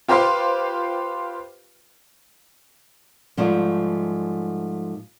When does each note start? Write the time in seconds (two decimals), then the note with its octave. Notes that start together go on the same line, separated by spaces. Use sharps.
0.08 F4 G4 B4 C5 F5
3.37 G#2 F3 G3 A3